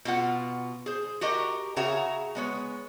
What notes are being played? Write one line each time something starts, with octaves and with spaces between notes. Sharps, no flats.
B2 F4 F#5
G#4 C5
F#4 G4 A#4 D#5
C#3 F#4 G#4 C#5 E5 A#5
G#3 B3 C#5